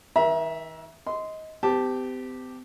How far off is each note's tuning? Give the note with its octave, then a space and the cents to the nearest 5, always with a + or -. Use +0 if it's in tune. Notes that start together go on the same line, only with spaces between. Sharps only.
D#3 +45 E5 +0 A#5 +35
D#5 +20 C6 -15
C4 -45 G4 +0 A5 +0